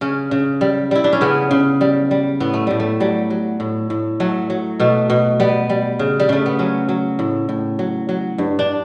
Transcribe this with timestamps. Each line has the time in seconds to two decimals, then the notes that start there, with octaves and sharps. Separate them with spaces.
0.01 C#3 C#4
0.31 C#3
0.61 G3
0.91 G3 E4
1.04 D4
1.13 C#4
1.21 C#3 B3
1.51 C#3
1.81 G3
2.11 G3
2.40 A2 B3
2.54 A3
2.67 A2 G3
2.80 A3
3.00 F#3 G3
3.30 F#3
3.60 A2
3.90 A2
4.20 F#3 A3
4.50 F#3
4.80 B2 A3
5.10 B2
5.40 G3 B3
5.70 G3
5.99 C#3
6.20 G3
6.29 C#3 A3
6.46 B3
6.59 F#3 C#4
6.89 F#3
7.19 A2
7.49 A2
7.79 F#3
8.09 F#3
8.38 G2
8.59 D4